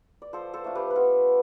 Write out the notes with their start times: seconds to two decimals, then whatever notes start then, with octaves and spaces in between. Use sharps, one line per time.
0.22 D5
0.33 F3 A4 C5
0.54 A4 C5
0.64 A3 D4 F4
0.75 G4 B4
0.90 B4
0.96 B3 F4 A4